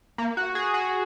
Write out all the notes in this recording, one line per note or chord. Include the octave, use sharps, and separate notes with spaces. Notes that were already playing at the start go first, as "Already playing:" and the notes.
A#3
F#4
G#4
F#4